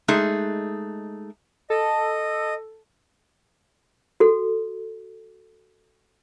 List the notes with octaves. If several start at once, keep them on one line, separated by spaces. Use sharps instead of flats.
G#3 A3 D#4 G#4
A4 D#5
F#4 A4